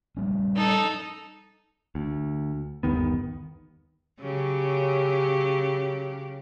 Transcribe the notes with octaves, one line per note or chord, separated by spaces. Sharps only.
F3 G3 C#4
D#4 A4
D2
G1 D#2 D#3 B3
C#3 F#3 G4